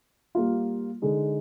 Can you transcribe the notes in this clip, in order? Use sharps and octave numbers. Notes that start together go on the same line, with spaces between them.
G3 A#3 F4
D3 G#3 D#4